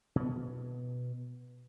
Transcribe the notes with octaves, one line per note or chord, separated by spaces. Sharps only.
B2 B3